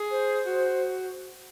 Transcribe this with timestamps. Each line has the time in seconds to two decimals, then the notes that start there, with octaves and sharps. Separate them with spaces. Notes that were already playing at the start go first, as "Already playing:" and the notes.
Already playing: G#4
0.11 C5
0.46 F#4